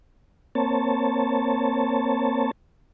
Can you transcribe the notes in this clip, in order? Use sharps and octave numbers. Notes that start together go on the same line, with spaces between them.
A#3 C4 C#5 A5